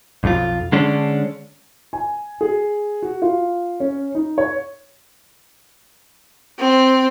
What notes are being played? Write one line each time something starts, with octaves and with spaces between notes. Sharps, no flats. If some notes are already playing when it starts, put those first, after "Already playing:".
B1 F2 F4
D3 G#3 C#4 D4
G#5
G#4
F#4
F4
C#4
D#4
C#5
C4